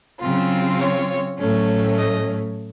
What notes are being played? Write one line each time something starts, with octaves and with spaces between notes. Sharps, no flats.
C#3 F#3 C4 F4
C#5
A2 F#3 A3 C#4
D#5